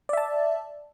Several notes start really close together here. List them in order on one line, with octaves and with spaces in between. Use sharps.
D5 E5 A5